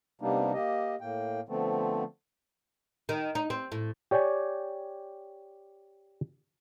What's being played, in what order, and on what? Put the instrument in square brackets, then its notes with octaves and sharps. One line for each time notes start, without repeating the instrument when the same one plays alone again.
[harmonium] C3 G3 A#3 B3 D4 D#4
A#3 G4 D#5
A2 A#3 G5
D3 F3 A3 B3 C4
[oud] D#3
D#4
C4
A2
[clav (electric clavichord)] G4 C#5 D5 G5 G#5